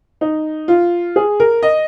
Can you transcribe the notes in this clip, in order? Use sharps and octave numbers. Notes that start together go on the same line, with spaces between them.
D#4
F4
G#4
A#4
D#5